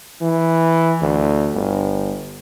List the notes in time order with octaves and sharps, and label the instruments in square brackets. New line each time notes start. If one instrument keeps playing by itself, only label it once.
[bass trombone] E3
D2
G1